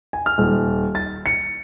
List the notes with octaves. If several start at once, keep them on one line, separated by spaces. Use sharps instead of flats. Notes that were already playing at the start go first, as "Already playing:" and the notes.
G#5
F6
D#1
A6
C#7